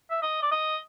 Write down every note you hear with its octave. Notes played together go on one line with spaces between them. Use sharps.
E5
D#5
D5
D#5